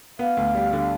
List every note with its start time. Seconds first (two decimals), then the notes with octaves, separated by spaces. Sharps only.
0.19 B3 F5
0.37 D2
0.55 G3
0.73 D3